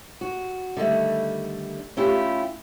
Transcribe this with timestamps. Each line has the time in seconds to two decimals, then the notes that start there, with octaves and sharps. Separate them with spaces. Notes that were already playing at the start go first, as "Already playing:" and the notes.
0.21 F#4
0.77 D3 D#3 G3 A3
1.97 A3 C#4 E4 F4 G4